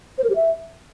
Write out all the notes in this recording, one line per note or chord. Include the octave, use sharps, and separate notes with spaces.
C5
A#4
G4
E5